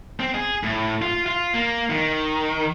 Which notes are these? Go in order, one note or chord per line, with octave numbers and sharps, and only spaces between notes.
C4
G#4
A2
F4
F4
A#3
D#3